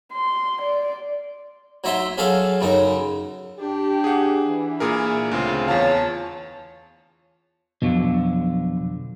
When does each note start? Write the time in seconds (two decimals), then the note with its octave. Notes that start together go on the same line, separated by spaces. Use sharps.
0.12 C6
0.62 D5
1.84 F#3 D#4 E5 C6
2.18 F#3 G#4 A4 F5
2.61 F#2 C#3 D#4
3.59 D4 G4
4.04 G#4 F#5
4.46 E3
4.80 A#2 G#4 A#4 E5
5.32 D2 C#3 C4 F4
5.68 E2 F4 G#4 C#5 F5 A5
7.82 F2 B2 D3 F3 F#3